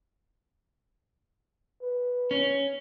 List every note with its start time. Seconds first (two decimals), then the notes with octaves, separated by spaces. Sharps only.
1.82 B4
2.31 C#4